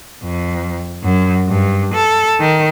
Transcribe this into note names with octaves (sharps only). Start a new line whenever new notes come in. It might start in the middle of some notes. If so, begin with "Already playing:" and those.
F2
F#2
G2
A4
D#3